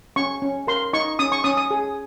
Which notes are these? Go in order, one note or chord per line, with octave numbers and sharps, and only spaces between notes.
C#4 C#6
C#4
A#4 C6
D#4 C#6
C#4 D#6
C#6
C#4 D#6
D#6
G#4